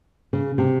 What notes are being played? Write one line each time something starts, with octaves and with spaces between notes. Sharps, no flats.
C#3
C3